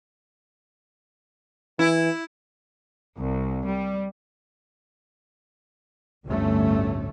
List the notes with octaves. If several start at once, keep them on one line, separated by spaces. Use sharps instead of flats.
E3 E4
C2
G3
G1 D2 A2 D3 A3 C#4